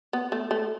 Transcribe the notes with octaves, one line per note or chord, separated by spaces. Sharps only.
B3
A3
A3